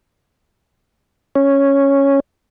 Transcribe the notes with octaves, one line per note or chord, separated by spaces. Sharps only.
C#4